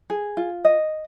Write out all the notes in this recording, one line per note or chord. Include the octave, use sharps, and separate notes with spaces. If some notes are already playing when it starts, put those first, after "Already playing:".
G#4
F4
D#5